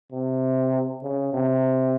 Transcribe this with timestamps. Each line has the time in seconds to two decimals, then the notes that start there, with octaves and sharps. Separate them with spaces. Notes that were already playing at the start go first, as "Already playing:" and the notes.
0.12 C3
1.03 C#3
1.33 C3